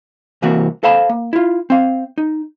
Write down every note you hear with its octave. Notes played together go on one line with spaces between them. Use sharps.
C2 E3 A#3 C4 F#4
A4 C5 F5 A5 B5
A#3
E4 F4
C4 F5
D#4